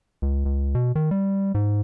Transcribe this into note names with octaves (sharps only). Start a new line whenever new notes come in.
C#2
C#2
B2
D#3
G3
G#2